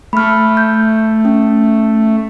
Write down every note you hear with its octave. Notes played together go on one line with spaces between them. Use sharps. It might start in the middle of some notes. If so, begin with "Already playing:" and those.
A3 B5 F6
G6
C#4